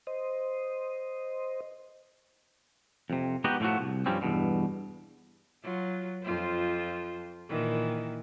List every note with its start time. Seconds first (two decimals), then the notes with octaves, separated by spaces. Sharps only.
0.07 C5 D#5
3.10 F2 C3
3.44 G#3 B3 D#4 F#4 G4 D#5
3.60 A2 F3 A3 B3 F#4
3.79 C2
4.06 G2 F3 G3 C4 C#4
4.22 E2 G2 B2
5.63 F#3 F4
6.23 F2 F4 C5
7.49 A#2 D#3 E3